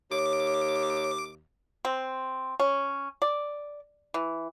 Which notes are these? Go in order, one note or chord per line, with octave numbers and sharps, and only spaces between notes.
D#2 C#5 D6
C4
C#4
D5
E3